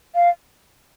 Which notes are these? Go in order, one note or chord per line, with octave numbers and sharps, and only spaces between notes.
F5